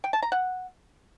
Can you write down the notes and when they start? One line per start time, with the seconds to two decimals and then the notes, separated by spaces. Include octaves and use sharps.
0.04 G5
0.13 A5
0.22 A#5
0.32 F#5